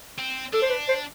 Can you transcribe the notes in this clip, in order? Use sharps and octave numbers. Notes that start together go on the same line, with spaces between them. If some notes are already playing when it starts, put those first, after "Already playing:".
C4
D4 A4
C5
B4
C5